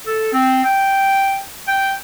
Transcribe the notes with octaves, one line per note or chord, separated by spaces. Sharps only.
A4
C4
G5
G5